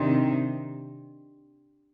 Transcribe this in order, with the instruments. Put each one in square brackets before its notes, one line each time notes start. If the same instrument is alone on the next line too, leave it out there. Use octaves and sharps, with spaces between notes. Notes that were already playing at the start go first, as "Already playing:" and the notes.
Already playing: [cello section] C3 D#3 [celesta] D4 G4 D5 G5 C6